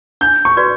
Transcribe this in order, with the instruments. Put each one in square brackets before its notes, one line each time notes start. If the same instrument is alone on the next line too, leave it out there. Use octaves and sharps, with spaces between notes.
[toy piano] D4 [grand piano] G6
[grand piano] C#6
[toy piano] F#4 B4 D5